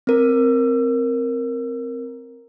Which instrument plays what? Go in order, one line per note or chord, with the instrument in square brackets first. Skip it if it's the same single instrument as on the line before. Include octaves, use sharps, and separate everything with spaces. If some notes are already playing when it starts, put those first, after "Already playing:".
[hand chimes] C4 A#4